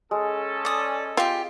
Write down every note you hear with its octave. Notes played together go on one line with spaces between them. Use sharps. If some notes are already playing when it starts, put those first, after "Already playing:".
G#3 C#4 A4
D5 D#6
C4 F4 G4